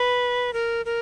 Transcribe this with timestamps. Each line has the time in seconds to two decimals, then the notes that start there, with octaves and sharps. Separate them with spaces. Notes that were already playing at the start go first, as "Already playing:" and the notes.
Already playing: B4
0.53 A#4
0.86 A#4